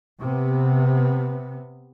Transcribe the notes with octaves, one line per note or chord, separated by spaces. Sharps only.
C3 B3